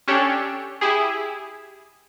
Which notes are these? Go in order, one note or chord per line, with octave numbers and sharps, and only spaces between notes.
C#4 D4 G4 A4 C#5
E4 G4 G#4